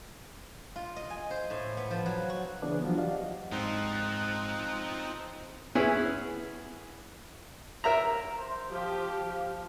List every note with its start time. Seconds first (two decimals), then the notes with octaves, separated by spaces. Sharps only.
0.76 F4
0.96 D#5
1.10 G#5
1.31 C5
1.50 A2
1.77 B3
1.91 F3
2.06 F#3
2.30 F#4
2.62 C#3 E3 B3 D4 G#4 B4
2.84 F3 F#3 F4 F#4
2.97 G4 D5 D#5 F5 F#5
3.52 G#2 F3 C4 D#4 F#6
5.75 B3 C#4 E4 G#4
7.84 A#4 E5 A#5
8.38 C5
8.71 F3 G4 F5
9.18 F3